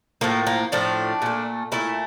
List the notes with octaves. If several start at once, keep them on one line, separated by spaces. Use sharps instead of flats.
A2 F3 A3 A#3
A#3
A2 F3 A3 D4
A#2 A3
A#2 A3 E4